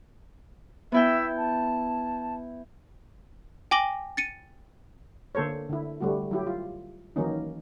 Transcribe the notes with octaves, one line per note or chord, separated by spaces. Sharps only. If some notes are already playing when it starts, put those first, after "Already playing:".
B3 E4 E5 G5
A5
G5 G#5 D6 A#6 F#7 G7
A6 C#7 D#7
D3 A#3 A4 C5 C#5
D3 E4
D3 G3 A3 F#4
F#3 E4 G4
F4
D#3 E3 F#3 A#3 C#4 D#4